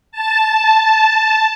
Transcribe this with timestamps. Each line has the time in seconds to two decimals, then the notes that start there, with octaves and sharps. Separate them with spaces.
0.12 A5